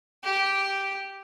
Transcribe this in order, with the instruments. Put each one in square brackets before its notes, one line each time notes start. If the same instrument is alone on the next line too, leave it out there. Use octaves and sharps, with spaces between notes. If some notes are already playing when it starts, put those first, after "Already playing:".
[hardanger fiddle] G4